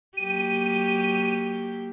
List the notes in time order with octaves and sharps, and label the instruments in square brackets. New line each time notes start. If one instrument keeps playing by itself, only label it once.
[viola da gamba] F#3 A#3 G4 [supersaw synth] D#7